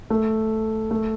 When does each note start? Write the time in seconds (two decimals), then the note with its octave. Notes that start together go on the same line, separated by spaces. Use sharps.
0.10 A3
0.91 A3